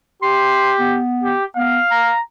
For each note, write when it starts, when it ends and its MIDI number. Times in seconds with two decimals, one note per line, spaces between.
0.22 1.00 67
0.22 0.74 84
0.80 1.34 59
1.23 1.44 67
1.56 1.79 59
1.56 2.14 77
1.91 2.21 82